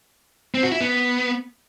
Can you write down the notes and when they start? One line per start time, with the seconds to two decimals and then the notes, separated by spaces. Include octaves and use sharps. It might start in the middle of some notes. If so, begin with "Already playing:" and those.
0.54 C4
0.63 F#4
0.72 E4
0.81 B3